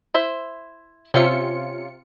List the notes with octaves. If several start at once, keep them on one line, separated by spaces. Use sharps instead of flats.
E4 C5 E5
C3 C#4 F4 C5 E5 C#7